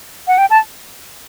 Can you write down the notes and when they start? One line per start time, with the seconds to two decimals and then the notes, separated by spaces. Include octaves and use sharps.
0.28 F#5
0.38 G5
0.50 A5